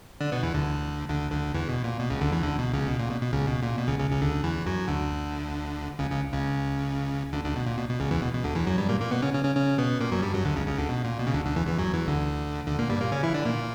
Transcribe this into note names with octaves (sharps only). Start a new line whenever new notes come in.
D3 D4
B2 B3
E2 E3
D2 D3
D2 D3
D2 D3
E2 E3
B2
A#2
B2
C#2 C#3
D2 D3
E2 E3
D2 D3
B2
C#2 C#3
B2
A#2
B2
B2
C#2 C#3
B2
A#2
B2
C#2 C#3
C#2 C#3
C#2 C#3
D2 D3
E2 E3
F#2 F#3
D2 D3
C#2 C#3
C#2 C#3
C#2 C#3
D2 D3
D2 D3
B2
A#2
B2
B2
C#2 C#3
E2 E3
B2
B2
D2 D3
E2 E3
F#2 F#3
G2 G3
A#2 A#3
A#2 A#3
B2 B3
C#3 C#4
C#3 C#4
C#3 C#4
C#3 C#4
B2 B3
A#2 A#3
F#2 F#3
G2 G3
F#2 F#3
D2 D3
C#2 C#3
C#2 C#3
D2 D3
B2
A#2
B2
C#3
D2 D3
D2 D3
E2 E3
E2 E3
F#2 F#3
E2 E3
D2 D3
D2 D3
A#2 A#3
G2 G3
A#2 A#3
C#3 C#4
E3 E4
D3 D4
A#2 A#3